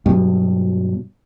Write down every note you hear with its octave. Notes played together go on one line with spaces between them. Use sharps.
G2 B2 F#3